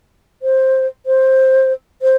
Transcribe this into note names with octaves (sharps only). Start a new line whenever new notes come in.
C5
C5
C5